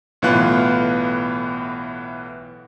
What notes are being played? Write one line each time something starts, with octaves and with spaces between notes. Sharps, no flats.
B1 A2 E3 B3 F4 F#6